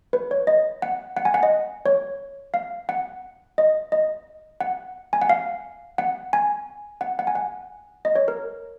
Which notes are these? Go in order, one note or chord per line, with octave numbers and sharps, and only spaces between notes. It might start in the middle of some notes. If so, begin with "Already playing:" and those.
B4
C#5
D#5
F#5
F#5
G#5
F#5
D#5
C#5
F5
F#5
D#5
D#5
F#5
G#5
F#5
F5
F#5
G#5
F#5
F#5
G#5
F#5
D#5
C#5
A#4